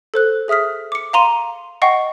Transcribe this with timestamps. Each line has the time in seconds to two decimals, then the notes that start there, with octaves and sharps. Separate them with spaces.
0.14 A4 C5 F#6
0.48 G#4 E5 D#6 F6 B6
0.92 D6 C#7
1.13 F5 A#5 C6 D#7
1.82 D#5 F#5 G5 C#6 C7